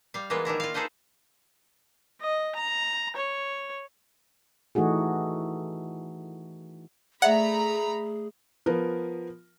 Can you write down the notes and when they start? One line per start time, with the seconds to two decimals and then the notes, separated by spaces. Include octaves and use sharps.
0.14 G3 F5
0.30 E3 G#3 A#3 B3 F4
0.45 D#3 D4 E4 A#5
0.60 F4 F5
0.74 D#4 G#4 A4 B4 C5 D#5
2.21 D#5
2.55 A#5
3.16 C#5
4.75 E3 A3 D#4 F#4 G#4
7.22 A3 G#4 D5 E5 F#5 A#5 B5
8.66 F3 B3 A#4